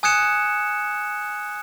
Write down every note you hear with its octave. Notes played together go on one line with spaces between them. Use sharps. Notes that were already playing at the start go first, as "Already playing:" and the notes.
G#5 D#6 F#6 G#6 C#7 E7